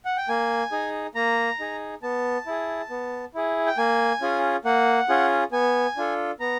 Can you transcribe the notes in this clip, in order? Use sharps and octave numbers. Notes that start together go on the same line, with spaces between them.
F#5
G5
A#3 G#5
D#4 G#4
A#3 A#5
D#4 G#4
B3 A5
E4 G#4
B3
E4 G#4
G5
A#3 G#5
C#4 F4 G#4
A#3 F#5
C#4 F4 G#4
B3 G#5
D4 F4 A4
B3 A#5